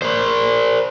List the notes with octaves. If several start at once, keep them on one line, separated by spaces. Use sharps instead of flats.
A#4 C5